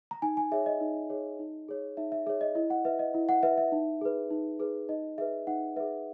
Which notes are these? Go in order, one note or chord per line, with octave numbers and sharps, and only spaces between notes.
A#5
D#4 G#5
G#5
G#4 C#5 E5
D#5
D#4
G#4 C#5
D#4
G#4 C#5
D#4 E5
E5
G#4 C#5 E5
D#5
E4 D#5
F#5
B4 E5
D#5
E4
F#5
B4 E5
E5
D#4
G#4 B4
D#4
G#4 B4
D#4 D#5
G#4 B4 E5
D#4 F#5
G#4 B4 E5